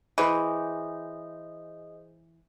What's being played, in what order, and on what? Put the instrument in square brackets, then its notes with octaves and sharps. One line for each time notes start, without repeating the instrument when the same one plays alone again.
[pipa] E3 [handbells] G#4 C5 D#5